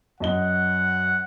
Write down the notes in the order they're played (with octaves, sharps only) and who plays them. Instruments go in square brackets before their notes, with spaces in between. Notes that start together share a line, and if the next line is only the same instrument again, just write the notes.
[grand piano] F#2 D#5 G7 [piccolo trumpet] F#5